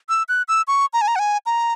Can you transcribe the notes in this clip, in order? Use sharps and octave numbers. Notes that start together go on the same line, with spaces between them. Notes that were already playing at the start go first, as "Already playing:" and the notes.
E6
F#6
E6
C#6
A#5
G#5
A#5
F#5
G#5
A#5